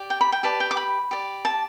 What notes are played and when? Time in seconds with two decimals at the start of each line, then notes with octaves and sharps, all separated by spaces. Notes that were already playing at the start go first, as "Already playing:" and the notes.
Already playing: G4 D5
0.10 G5
0.21 B5
0.32 G5
0.43 G4 B4 D5 A5
0.60 G5
0.71 D6
0.77 B5
1.11 G4 D5
1.45 A5